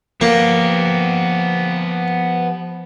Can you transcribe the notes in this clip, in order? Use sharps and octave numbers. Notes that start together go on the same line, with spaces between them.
F3 A#3 B3 G4